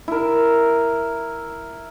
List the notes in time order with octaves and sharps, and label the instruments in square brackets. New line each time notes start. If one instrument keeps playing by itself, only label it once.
[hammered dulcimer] E4 A#4